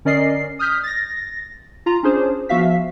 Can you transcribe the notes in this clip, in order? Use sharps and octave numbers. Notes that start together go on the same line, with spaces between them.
D3 C#4 A#4 D5 D#5 C7
D#6 F6 G6 B6
A6 A#6
F4 A#5
C#4 D4 G#4 C5
F3 B3 F#4 E5 F5 B6